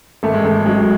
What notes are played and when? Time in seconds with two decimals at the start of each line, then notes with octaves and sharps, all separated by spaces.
0.23 G#1 A3
0.34 G#3
0.45 G#1 A3
0.66 F#3 G#3